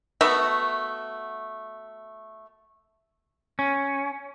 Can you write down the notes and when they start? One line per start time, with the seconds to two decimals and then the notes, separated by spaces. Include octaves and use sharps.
0.21 A3 B3 F#4 E5
3.59 C#4